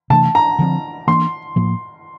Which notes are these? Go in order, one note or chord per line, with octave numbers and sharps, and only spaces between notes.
C3 E3 A3 D4 A5
A#5
D3 F3 A3 C4
E3 A#3 D4 C6
A2 F3 A#3